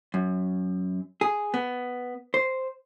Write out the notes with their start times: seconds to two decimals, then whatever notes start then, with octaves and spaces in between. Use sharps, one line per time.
0.14 F#2
1.21 G#4
1.54 B3
2.34 C5